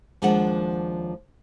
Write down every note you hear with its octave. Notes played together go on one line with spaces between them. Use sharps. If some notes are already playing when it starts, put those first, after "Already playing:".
D#2 F3 G#3 D4 F#5